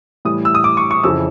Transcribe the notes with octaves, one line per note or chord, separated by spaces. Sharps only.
A2 E3 G3 D#6
E6
D#6
D6
C#6
C#6
F2 C#3 E3 E6